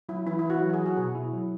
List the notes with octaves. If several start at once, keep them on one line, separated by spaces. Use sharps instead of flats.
F#3 E4
E3 E4
E4
E3
F#4
F#3
F#4
G#4
F#3
F#4
B2 G#4
E4
F#3